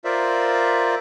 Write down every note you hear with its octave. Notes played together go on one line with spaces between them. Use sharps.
F4 A#4 C5 D5 E5